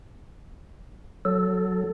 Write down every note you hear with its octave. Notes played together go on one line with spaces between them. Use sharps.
F#3 A4